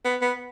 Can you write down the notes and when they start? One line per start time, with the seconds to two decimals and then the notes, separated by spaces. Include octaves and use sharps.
0.05 B3
0.22 B3